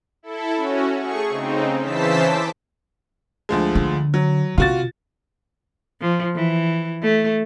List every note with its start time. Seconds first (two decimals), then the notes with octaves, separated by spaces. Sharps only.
0.23 E4 A4
0.56 C#4 F#4
0.97 A3 G#4 C#6
1.29 C#3 C4 D#4
1.80 C#3 E3 C5 A5 E6 B6
2.21 D6
3.49 D2 F3 G#3
3.75 D3
4.14 F#3
4.58 C3 F4 F#4 A6
6.01 F3
6.35 E3
7.02 A3